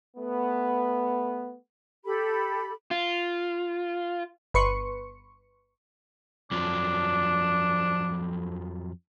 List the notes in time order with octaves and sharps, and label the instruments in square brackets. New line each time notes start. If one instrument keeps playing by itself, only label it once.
[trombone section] A3 B3
[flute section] G4 A4 B5
[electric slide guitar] F4
[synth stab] G1 B4 C6 C#6 C#7
[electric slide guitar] F2 F3 F#3 [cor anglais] D4